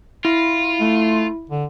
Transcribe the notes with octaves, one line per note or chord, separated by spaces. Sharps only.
E4 F4
A3
D3